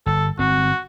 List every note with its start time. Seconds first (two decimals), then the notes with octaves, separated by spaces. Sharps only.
0.06 G1 A4
0.39 G1 C4 F#4